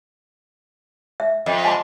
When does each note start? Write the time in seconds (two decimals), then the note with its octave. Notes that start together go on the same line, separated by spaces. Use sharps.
1.20 E5
1.46 F2 D#5
1.64 G#5 A5 C6